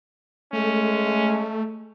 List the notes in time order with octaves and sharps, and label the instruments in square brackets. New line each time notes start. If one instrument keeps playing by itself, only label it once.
[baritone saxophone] G#3 [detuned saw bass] A3 [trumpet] C#4